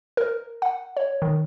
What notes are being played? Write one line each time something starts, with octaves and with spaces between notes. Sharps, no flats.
A#4
F#5
C#5
D#3